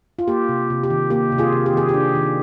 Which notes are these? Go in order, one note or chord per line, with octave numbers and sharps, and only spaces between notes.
F4
A#3 G4
C3
C3
G4
D#3
A#3 G4
C3
F4 G#4
C3
G4
D#3 G#4
G4
D4
D#3